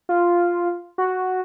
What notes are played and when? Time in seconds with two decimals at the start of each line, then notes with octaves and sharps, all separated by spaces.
0.09 F4
0.98 F#4